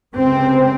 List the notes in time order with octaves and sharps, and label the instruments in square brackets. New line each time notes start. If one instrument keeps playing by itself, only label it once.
[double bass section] C#2 C3 C4